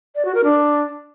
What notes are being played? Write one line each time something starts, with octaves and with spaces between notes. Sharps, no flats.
D5
F#4
A#4
D4